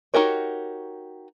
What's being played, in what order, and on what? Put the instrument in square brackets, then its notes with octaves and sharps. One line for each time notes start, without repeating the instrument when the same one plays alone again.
[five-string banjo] D#4 F#4 G4 A#4 C#5